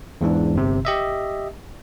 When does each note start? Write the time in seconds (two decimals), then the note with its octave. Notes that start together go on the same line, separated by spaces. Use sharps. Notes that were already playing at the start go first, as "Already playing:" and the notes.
0.21 E2 G#2 E3 D4
0.55 G1 C3
0.85 G4 D#5 E5